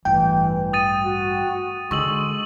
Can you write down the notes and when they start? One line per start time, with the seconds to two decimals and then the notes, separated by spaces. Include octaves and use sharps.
0.05 A1 G2 E3 G5
0.73 D#6 A6 D#7
1.03 F#4
1.91 D3 G#3 C#6 E6 F#7